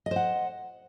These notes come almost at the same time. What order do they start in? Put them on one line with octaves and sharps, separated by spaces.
D#5 C5 F#5